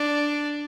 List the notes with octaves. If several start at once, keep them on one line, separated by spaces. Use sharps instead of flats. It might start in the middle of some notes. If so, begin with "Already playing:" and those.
Already playing: D4